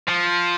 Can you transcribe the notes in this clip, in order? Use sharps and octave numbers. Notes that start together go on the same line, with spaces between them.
F3